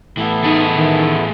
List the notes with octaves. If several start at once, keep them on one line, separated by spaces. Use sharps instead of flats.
A2 E3 B3 E4 A4
A3 D#4 G#4
D#3